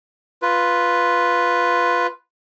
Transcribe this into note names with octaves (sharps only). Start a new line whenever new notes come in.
F4 B4